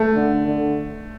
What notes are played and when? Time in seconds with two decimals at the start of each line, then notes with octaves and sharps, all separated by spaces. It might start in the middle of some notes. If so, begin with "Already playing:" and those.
Already playing: A3
0.15 D3
0.47 D3